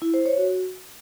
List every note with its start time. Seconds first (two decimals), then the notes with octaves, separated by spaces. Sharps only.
0.02 E4
0.14 C5
0.26 C#5
0.38 F#4